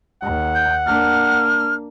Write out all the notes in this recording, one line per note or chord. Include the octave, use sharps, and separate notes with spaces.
D#2 F#5
G6
A#3 D4 F6